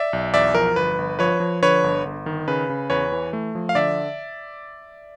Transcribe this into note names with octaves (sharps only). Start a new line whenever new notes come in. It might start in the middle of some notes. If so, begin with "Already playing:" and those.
Already playing: D5 E5
B1
E2 D5 E5
F3 A#4
G1 B4
G1
F3 B4 C#5
F3
D3 B4 C#5
G1
G1
D#3
C#3 B4
C#3
E2 B4 C#5
E3
A3
F3
F5
D3 D5 E5